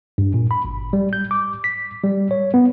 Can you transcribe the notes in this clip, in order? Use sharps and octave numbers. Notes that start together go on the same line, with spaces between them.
G2
A#2
B5
G#1
G3
G6
D6
B6
G3
C#5
B3